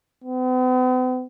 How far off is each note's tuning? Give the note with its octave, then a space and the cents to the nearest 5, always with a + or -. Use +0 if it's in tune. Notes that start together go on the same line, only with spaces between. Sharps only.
B3 +45